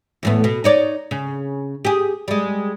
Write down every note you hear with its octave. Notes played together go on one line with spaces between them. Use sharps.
E2 A2 B3
B2
D#4 C#5 D5
C#3
G4 G#4
G3 G#3